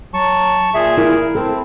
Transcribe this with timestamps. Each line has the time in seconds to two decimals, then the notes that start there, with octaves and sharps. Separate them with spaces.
0.14 F#3 A5 C#6
0.74 A#2 G#4 E5
0.98 E4 A#4
1.35 C4 E4 A4